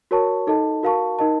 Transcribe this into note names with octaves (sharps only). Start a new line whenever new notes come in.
F#4 A#4 C#5 A5 C#6
D#4 A4 D#5 A5
F#4 A#4 F5 A5 C#6
D#4 A#4 D#5 A5